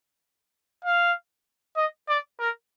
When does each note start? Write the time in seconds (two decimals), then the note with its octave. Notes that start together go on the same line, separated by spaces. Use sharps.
0.85 F5
1.77 D#5
2.09 D5
2.40 A#4